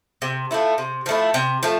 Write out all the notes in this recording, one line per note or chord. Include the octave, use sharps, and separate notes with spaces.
C3
F3 A3 E4
C3
F3 A3 E4
C3
F3 A3